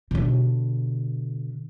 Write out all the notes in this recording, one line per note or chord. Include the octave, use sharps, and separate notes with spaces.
B2 D3